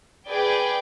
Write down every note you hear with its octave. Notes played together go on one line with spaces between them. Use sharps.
G#4 B4 D5 G5